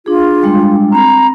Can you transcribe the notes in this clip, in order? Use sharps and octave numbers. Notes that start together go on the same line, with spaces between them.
D4 F4 G#4
G3 G#3 D4
C4 A#5 B5